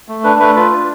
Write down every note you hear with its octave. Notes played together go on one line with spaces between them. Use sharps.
A3
D4 B4
A3 B4
F4 B4
D4